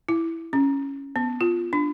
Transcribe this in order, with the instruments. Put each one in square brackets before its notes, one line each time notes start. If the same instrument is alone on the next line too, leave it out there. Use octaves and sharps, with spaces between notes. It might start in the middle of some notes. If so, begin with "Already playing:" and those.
[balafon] E4
C#4
B3
F4
D4